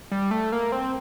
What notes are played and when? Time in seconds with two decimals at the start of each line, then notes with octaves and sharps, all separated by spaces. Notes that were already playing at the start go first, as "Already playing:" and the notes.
0.12 G3
0.31 A3
0.52 A#3
0.72 C4